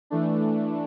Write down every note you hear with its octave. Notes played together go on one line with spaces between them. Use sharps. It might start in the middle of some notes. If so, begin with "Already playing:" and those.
E3 A3 D4